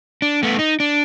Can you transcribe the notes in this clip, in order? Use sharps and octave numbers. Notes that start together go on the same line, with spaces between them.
D4
A3 B3
D#4
D4